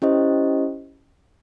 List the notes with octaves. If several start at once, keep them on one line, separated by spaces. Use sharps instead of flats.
C#4 E4 G4 C5 D#5